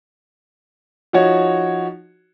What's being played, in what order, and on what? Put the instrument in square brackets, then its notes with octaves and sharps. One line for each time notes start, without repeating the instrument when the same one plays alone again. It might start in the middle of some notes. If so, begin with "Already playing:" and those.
[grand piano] F3 D#4 F#4 C#5